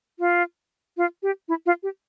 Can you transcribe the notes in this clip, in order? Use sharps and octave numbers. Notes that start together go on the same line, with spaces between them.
F4
F4
G4
E4
F4
G4